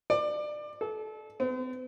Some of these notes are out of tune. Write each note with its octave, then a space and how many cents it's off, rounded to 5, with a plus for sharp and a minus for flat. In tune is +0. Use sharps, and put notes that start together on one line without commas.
D5 +25
A4 -30
C4 -45